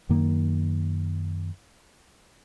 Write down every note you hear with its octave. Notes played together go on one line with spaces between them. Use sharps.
F#2 D#3 A#3